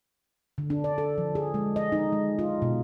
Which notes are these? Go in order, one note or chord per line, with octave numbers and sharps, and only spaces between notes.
D3
D4
D5
A4
F3
G#4
G#3
D#5
D#4
G#3
F4
B2